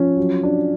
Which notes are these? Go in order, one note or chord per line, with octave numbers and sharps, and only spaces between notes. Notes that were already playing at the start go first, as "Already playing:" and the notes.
Already playing: F3 C#4
F#3
D4